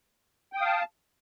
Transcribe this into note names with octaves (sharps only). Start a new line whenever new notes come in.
F5 G5 A5 D#6